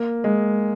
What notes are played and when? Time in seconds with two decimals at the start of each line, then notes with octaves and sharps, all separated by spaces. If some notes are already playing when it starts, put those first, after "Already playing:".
Already playing: A#3
0.24 G#3